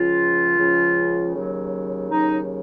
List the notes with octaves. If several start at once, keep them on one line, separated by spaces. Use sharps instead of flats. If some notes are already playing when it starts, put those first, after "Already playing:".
Already playing: C#2 C#3 F3 F4
C#2 C#3 F3
D#2 C#3 F#3
D#2 C#3 F#3 D#4